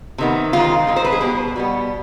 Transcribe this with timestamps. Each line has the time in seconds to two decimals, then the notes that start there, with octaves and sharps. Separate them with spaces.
0.18 C3 D#3 B3
0.53 D#3 G#3 C4 F4
0.87 D#3 G#3 C4
0.96 C5
1.04 B4
1.12 G#4
1.21 B2 G3 B3 G4
1.56 B2 G3 B3